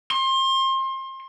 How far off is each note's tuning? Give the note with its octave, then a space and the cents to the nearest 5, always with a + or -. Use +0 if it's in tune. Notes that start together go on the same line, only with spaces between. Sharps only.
C6 +30